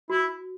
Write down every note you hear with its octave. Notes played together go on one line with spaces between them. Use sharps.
E4 F#4